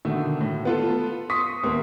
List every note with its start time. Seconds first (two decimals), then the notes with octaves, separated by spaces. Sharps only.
0.05 B2 D3 D#3 A3
0.41 A2
0.65 B3 F4 A4
1.30 C6 C#6 D#6 B6
1.63 D#2 A2 A#3 B3